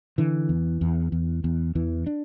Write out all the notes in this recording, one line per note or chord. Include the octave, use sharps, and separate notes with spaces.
D3 E3
E2
E2
E2
E2
E2 E3
D4